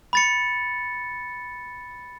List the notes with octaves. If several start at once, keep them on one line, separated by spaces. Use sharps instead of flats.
B5 A6 C#7